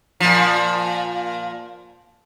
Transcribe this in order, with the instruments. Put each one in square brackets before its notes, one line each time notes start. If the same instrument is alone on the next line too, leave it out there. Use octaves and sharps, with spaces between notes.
[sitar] A#2 F3